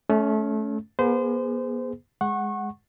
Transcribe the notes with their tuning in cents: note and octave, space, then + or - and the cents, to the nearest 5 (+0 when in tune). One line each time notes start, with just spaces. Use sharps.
A3 -25 C#4 +15
B3 -45 G#4 +0 C5 -30
G#3 +0 F#5 +0 C#6 -25